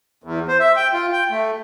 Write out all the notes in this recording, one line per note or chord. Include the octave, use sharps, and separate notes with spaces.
E2
C5
E5
G5
F4
G5
A3